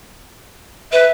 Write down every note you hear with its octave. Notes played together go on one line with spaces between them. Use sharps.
B4 E5